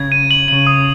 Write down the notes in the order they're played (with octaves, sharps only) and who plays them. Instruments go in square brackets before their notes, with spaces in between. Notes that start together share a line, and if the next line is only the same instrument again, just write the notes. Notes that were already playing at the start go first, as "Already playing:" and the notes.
Already playing: [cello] C#3 [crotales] G#6
[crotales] D#7
F#7
[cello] C#3 [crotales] F#7
[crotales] D#6